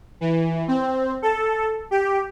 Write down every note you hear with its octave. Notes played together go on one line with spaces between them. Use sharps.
E3
C4
A4
G4